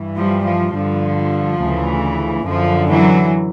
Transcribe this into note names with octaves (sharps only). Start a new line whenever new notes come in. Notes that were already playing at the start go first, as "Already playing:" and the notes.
Already playing: G2 E3
F3 G3
F3
G2 D3 F3
D2 C#3 E3
F#2 D3 F3
E3 F#3